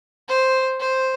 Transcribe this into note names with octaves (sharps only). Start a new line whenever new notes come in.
C5
C5